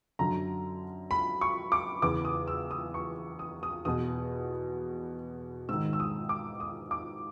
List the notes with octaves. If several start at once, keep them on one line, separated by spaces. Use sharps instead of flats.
F#2 D3 A#5
B5
C#6
D6
E2 C#3 E3 D6
D#6
E6
D#6
C#6
D#6
D#6
E2 B2 D#6
G#2 D#3 E6
E6
D#6
D6
D#6
D6